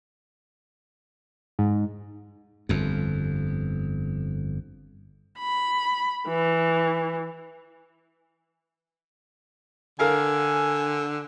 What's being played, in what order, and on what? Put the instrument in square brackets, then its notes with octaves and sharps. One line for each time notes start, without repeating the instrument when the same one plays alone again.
[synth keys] G#2
[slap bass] G1 F2
[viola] B5
E3
[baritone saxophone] D3 [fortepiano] A4 A#4 F5 [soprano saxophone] G#5